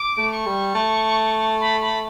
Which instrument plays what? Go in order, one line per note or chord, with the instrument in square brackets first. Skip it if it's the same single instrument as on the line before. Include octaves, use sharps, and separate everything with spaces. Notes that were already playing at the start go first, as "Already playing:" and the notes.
Already playing: [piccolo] D6
[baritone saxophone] A3
[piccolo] C#6
[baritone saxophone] G3
A3
[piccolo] B5
B5